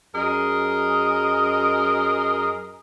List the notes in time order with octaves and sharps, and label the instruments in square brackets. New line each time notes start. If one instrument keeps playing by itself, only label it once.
[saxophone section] F#2 G#4 A#4 D#5